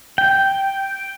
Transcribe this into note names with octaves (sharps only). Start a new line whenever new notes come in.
G5